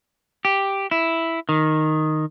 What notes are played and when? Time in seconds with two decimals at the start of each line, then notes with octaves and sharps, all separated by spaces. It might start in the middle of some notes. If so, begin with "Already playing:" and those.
0.45 G4
0.91 E4
1.49 D#3